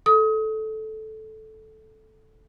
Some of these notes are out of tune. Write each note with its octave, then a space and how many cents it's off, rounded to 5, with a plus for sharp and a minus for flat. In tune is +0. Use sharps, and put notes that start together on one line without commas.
A4 -10 D#6 +30